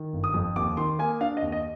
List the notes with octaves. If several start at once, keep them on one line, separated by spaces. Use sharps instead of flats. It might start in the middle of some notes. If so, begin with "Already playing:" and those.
Already playing: D#3
G1
D#6
F2
D#2 D6
D#3 C6
A#3 G#5
D4 F5
D#5
D#2
D#5